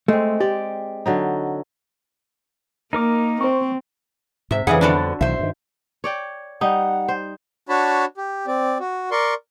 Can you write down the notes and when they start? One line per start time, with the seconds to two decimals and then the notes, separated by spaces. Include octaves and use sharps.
0.08 G#3 A3 C4
0.40 G4 D5
1.06 D3 F#3 D#4
2.93 A#3 D#4 A#4 D6
3.41 C4 C5 C#6
4.51 G#2 C3 E5
4.67 F2 C#3 E3 G3 G#4 F#5
4.81 D3 G3 B3 D4 F#4 A4
5.21 B1 D#3 E3 C5 E5
5.39 G2 D#3
6.04 C#5 D5 G5
6.61 G3 D#4 F#5
7.08 C5
7.69 D4 F#4 C#5 A5 B5
8.17 G4
8.47 C4 D5
8.80 F#4
9.11 A#4 D5 C6 C#6